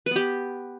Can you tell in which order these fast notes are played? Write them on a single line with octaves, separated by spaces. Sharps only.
B4 B3 G4